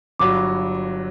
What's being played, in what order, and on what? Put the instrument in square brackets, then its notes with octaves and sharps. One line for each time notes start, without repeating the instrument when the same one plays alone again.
[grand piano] G1 G2 F#3 [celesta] D6